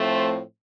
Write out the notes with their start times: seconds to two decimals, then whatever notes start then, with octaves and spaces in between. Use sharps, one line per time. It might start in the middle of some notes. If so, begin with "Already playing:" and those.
Already playing: A2 F3 A3 C4